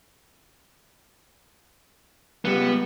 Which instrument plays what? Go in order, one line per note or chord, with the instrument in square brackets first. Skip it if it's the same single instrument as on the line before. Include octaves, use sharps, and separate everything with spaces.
[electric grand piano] C#2 G3 E7 [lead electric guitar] B3